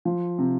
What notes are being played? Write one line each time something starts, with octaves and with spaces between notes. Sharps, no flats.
F3
C3